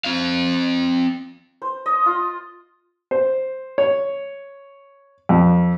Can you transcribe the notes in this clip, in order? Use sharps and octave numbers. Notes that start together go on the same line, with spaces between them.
C4 F5
C5
D#5
F4
C5
C#5
F2